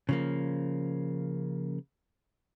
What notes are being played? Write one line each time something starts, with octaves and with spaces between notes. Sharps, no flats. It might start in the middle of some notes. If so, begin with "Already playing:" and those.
C#3 F3 A#3